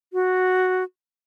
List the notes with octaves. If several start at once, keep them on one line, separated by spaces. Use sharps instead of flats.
F#4